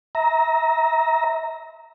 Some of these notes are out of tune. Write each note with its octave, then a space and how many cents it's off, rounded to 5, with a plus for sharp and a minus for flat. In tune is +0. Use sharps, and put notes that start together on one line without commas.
E5 -30 A#5 +5